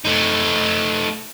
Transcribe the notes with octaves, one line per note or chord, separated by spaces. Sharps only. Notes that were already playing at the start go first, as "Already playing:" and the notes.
A3 D#4